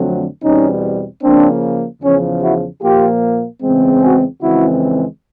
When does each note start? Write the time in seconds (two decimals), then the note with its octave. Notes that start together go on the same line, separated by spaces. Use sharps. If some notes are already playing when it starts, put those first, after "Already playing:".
Already playing: F2 D3 F#3 A3 C4
0.43 E2 B2 G3 C4 C#4 D#4
1.22 C#3 F3 A#3 C4 D4
2.02 E2 C#3 F3 C#4
2.42 E4 F#4
2.82 A#2 F3 A#3 F4 G4
3.62 E2 C#3 E3 G#3 C4
4.02 F#4 G#4
4.41 F2 C#3 E3 G#3 C4 E4 F#4